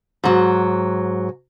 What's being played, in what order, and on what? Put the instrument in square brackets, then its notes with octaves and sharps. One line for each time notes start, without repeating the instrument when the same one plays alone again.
[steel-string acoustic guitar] G#2 F#3